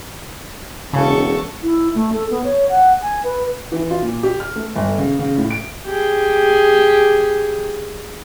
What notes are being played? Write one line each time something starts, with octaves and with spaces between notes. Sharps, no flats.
E1 C#3 A4 C#6
E4
A3
A4
B3
C#5
F#5
G#5
B4
E3
F4
A#2
G4
F6
A3
G1
C#3
C#3
A2
D7
G4 G#4